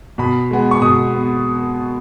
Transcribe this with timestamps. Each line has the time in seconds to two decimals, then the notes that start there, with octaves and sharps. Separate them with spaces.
0.18 B2 B5
0.51 G#3 B3
0.71 C#6
0.82 B2 D#6
1.14 B3